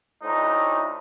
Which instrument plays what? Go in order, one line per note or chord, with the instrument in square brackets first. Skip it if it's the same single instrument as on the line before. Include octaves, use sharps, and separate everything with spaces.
[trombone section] D2 A2 D#4